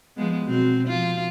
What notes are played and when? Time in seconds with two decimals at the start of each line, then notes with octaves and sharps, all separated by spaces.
0.17 F3 G#3 B3
0.46 B2 F#3 C4
0.87 F3 F4